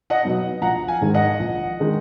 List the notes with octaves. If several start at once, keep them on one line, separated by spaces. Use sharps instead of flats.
D#5 F#5
B2 F#3 B3 D#4
A#1 F#5 A#5
F5 G#5
G#2 D#3 G#3 D#4
D#5 F#5
A#1
D#3 G#3 D#4